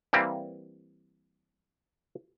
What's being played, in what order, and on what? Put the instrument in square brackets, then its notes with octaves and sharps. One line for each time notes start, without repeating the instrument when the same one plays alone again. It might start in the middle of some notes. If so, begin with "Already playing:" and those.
[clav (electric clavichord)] E3 G3 A#3 C4